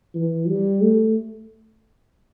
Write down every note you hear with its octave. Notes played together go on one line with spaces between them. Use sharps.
E3
G3
A3